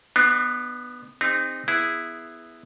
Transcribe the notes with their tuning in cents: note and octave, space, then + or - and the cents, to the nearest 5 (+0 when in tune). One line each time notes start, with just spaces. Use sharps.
B3 +0 D4 +40
C4 +0 D#4 -15 G4 +45
B3 +0 E4 +0 G#4 +0